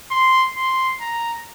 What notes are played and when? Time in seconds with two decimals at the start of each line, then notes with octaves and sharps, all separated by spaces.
0.11 C6
0.56 C6
1.01 A#5